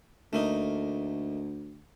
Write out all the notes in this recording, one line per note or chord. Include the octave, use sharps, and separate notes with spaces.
D2 A3 A#3 D#4